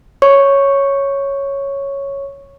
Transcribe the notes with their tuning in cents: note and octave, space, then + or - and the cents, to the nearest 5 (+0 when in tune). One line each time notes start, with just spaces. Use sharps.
C#5 +0 C#6 +0